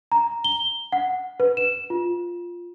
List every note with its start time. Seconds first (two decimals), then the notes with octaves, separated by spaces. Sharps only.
0.12 A#5
0.44 G7
0.92 F#5
1.40 B4
1.57 E7
1.90 F4